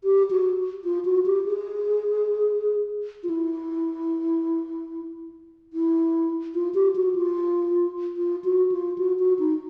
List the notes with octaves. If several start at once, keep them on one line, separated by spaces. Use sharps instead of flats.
G4
F#4
F4
F#4
G4
G#4
F4
E4
E4
F4
G4
F#4
F4
F4
F#4
F4
F#4
F#4
D#4